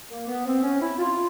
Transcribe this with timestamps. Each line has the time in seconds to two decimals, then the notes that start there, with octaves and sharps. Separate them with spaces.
0.10 A#3
0.27 B3
0.46 C4
0.63 C#4
0.81 E4
0.98 F4